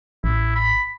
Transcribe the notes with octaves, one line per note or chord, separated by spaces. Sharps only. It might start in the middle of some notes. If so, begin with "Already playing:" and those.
A1 E4
B5